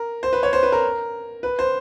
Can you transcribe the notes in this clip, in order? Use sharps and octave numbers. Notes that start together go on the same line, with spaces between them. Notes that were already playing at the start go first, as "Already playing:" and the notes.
Already playing: A#4
C5
B4
C#5
C5
B4
A#4
B4
C5